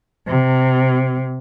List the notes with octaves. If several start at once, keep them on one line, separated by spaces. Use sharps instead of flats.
C3